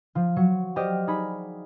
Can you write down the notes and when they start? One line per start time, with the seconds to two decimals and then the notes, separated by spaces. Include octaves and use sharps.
0.15 F3 F4
0.36 F#3 C#7
0.76 G4 C5 D5 D#5 D6 F6
1.07 D#4 G#4 B5